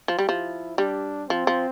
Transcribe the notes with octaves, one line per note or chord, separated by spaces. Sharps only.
F3
G3
F3 E4
G3 D4
F3 C4
F3